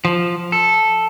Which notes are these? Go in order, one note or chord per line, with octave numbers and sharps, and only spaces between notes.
F3
A4